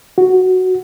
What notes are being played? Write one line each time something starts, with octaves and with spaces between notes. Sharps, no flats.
F#4